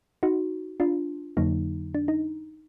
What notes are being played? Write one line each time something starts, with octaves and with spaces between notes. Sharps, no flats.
D#4 F#4
D4 F4
F2 D3 F#3 A#3 D#4
D4
D#4